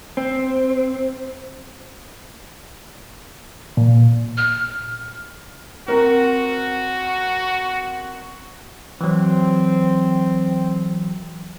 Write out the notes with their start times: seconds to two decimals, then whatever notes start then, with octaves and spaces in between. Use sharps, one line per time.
0.17 C4
3.77 A#2
4.37 F6
5.88 C4 F#4 A#4
9.01 E3 F#3 C4